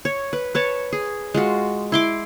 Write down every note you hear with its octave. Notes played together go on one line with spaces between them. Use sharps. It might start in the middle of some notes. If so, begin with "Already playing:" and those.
C#5
B4
B4 C#5 A5
G#4
G#3 F4 F#4
E4 C6 D6